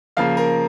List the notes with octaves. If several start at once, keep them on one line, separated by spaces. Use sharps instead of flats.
C#3 F3 A#3 F5
A#4